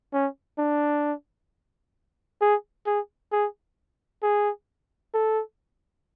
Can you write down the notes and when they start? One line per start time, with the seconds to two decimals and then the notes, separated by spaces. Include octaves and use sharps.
0.13 C#4
0.58 D4
2.41 G#4
2.86 G#4
3.32 G#4
4.22 G#4
5.14 A4